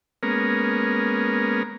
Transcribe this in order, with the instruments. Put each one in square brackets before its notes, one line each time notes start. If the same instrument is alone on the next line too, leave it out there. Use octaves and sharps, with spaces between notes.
[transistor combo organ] G#3 A#3 B3 C#4 A#4